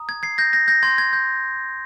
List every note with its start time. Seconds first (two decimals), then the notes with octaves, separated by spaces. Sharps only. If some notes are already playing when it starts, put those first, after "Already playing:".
Already playing: A#5 D#6
0.09 G#6
0.23 G#6 C7
0.38 G6 A#6
0.53 G6 A#6
0.68 G6 A#6
0.83 C6 G6 G#6
0.98 G#6
1.13 G6